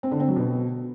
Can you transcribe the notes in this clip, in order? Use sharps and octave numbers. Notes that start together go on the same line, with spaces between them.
C4
D3
C4
F#3
B2